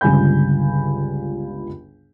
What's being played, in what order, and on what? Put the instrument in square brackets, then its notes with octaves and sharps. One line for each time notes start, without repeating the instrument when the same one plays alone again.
[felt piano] G1 C#2 G3 G#5 B5 G6